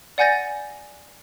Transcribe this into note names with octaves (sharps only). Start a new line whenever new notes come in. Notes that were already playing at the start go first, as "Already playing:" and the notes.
D5 F#5 G#5 G6 A6 A#6